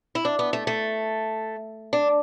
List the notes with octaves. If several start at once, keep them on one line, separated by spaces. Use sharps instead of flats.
E4
D4
B3
A3
A3
D4